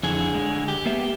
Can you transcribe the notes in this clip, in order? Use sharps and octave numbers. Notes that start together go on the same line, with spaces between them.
F2 D3 E3 G#4
G#3
G4
A#3 B3 E5